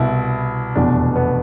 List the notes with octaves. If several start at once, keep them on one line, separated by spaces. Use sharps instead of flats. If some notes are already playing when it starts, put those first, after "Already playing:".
Already playing: C2 B2 E4
F1 E2 B2 D4
B3